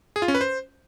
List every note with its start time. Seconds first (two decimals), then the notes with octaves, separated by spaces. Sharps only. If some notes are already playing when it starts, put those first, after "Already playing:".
0.16 G#4
0.22 F4
0.28 C#4
0.35 B4
0.41 C5